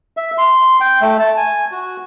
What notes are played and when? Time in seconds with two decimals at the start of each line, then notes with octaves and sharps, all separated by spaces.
0.17 E5
0.38 C6
0.80 G5
1.01 A3
1.19 A5
1.37 G#5
1.72 F#4